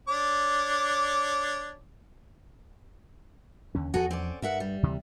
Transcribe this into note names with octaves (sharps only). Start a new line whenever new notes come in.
D4 C#5 D6
D#2 D3 C#4
E2 F3 F#4 G#4 A4
C4 C#4 D5
G2 A#4 E5 F#5
G3
D2 C3 E3